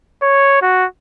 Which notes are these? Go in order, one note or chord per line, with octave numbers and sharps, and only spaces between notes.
C#5
F#4